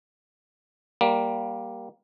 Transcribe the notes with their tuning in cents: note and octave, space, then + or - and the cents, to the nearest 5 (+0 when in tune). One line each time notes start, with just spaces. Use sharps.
G3 -5 A#3 +10